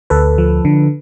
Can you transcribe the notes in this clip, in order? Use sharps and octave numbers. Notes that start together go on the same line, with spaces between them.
D2 A4 B4
F3
D3